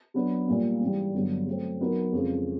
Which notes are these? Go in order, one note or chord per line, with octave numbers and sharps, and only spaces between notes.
F#3 B3 D4
A#2 G3 A#3
G#2 E3 G3
G2 D3 F#3 B3
F#3 A3 C4
F#3 B3 D#4 F#4 A#4
F2 C#3 F3 G#3